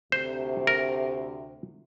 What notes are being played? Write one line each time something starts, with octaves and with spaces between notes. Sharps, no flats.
D2 C3 C5
A#4